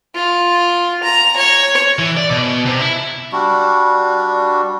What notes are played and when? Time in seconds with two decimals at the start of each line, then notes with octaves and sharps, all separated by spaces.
0.15 F4
1.04 A#5
1.37 C#5
1.99 E3
2.17 D5
2.31 B2
2.66 C3
2.80 E4
3.32 G3 D4 F#4